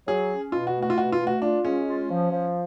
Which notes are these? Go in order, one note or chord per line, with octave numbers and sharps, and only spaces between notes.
F#3 G#4
C#4
B2 F4
F#4
A3
F#4
F4
B2 F#4
F4
A3
F#4
D4 F4
G#3 C#4
F4
F3
F3